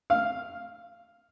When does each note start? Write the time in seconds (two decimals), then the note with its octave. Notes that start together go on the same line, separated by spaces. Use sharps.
0.10 F5